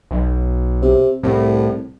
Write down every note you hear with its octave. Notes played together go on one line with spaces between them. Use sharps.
B1
C3
C2 A2